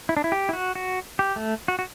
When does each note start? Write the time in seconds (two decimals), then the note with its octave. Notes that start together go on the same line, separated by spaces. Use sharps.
0.09 E4
0.17 D4
0.24 E4
0.32 G4
0.49 E4
0.53 F#4
0.75 F#4
1.19 G4
1.36 A3
1.68 F#4
1.79 F#4